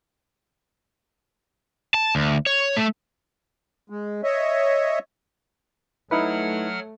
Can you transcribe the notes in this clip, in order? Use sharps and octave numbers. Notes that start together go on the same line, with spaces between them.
A5
D2
C#5
A3
G#3
C#5 D#5 E5
F#3 A3 D#4 E4 B4 F#5 F6